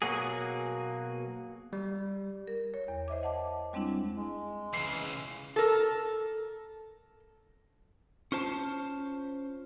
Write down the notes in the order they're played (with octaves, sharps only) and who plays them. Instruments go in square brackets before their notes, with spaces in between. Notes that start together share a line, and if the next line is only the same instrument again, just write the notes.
[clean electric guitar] B2 F#3 A#3 F#4 G#4
[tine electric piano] G3
[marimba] A#4
C#5
E2
C5 D#5 E5 D6
F#5 A5 D6
G3 G#3 C4 D4 E4
[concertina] G#3
[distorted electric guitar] C#3 E3 [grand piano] C7
[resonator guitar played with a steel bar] A4 A#4
[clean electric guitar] C#4 F4 C5 A5